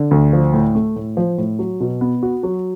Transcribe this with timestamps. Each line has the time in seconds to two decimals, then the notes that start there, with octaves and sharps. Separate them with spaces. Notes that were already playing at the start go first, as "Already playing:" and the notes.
Already playing: D3
0.11 D2
0.33 F3
0.54 A2
0.75 A3
0.96 A2
1.17 F3
1.38 A2
1.59 F#3
1.80 B2
2.01 B3
2.23 F#4
2.43 F#3